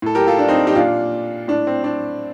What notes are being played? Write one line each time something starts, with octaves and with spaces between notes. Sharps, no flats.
A2 A4
G4 A#4
F4 A4
D4
C4 D#4
D#4 G4
A#2 D4 F4
A2 D4
C4
D4